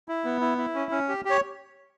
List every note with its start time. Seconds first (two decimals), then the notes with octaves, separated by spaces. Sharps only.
0.08 E4
0.25 B3
0.41 E4
0.58 E4
0.75 C#4
0.91 C#4
1.08 G4
1.25 G4 C#5